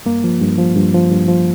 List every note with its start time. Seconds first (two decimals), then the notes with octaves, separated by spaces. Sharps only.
0.05 G2 A#3
0.24 F3
0.41 G2
0.58 F3
0.76 G2
0.94 F3
1.11 G2
1.28 F3